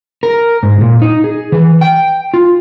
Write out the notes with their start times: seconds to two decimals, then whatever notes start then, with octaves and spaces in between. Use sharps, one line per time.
0.23 A#4
0.63 G#2
0.81 A#2
1.02 D#4
1.24 G#4
1.52 E3
1.81 G5
2.34 F4